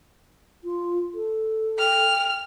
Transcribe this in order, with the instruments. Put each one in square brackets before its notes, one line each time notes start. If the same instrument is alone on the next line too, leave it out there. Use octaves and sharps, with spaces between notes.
[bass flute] F4
A4
[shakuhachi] G5 [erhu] F6